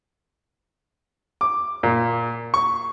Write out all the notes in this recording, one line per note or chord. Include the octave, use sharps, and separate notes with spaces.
D6
A#2
C#6